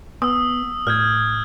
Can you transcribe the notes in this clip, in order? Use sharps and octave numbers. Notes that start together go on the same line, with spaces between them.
B3 D#6 E6
A2 F6 G6 G#6